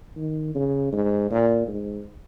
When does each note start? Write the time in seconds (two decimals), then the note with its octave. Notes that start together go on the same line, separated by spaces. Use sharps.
0.16 D#3
0.55 C#3
0.93 G#2
1.31 A#2
1.68 G#2